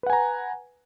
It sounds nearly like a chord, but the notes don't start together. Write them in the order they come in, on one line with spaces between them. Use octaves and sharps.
B4 F#5 G#5 A#5